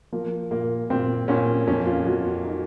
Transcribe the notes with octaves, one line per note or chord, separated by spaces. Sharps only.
F3 A#3
A#2 A#3
A#2 C4
A#2 C#4
F2 C#4
F4
F2 F#4
F#4
D#4